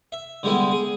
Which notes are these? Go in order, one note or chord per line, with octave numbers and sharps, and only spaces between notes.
E5
D3 G3 G#3 B3 E4
G#4